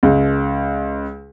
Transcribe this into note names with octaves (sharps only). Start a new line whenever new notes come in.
C#2